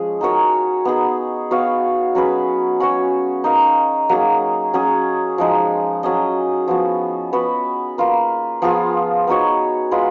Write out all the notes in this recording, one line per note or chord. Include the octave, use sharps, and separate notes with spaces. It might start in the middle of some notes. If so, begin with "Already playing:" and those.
Already playing: F3 G#3 C#4 G#4
D#4 F#4 A#4 C#5
B3 D#4 G#4
B3 F#4 C#5 F5
F#3 C#4 G#4 B4
C#4 F#4 C#5
D#4 A#4 F5
F#3 A#3 D#4 G#4
F#3 C#4 G#4
F3 G#3 D#4
F#3 C#4 G#4 D#5
F3 B3 F#4
B3 F#4 B4
A#3 F4 B4
F3 B3 F4 G#4
B3 D#4 F#4 C#5
G#3 B3 F4 B4